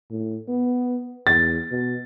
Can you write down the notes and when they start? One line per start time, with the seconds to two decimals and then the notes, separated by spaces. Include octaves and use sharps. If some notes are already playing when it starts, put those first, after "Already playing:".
0.10 A2
0.48 B3
1.27 E2 A6
1.71 B2